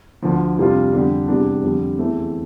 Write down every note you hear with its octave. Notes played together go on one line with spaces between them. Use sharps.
D2 D3 F3
F2 C3 G3 D4 F4
F2 D3 G3 D4 G4
E2 C3 G3 D4
F2 D3 G3
E2 E3 A3 C4